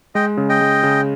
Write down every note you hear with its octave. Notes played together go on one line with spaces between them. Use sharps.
G#3 D#5 G5
C#3
D#5 G5
G#3
C#3